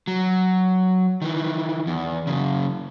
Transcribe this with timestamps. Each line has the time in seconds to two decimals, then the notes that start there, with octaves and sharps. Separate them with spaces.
0.08 F#3
1.22 D#3 E3
1.87 E2
2.27 F#2 C#3